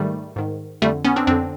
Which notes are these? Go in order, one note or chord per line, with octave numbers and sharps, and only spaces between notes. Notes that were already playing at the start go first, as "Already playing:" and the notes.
Already playing: G#2 D#3 G3 A3
G#2 D#3
F2 D3 G3 A3
B3 C#4
C4 D4
F2 D3 C4 D4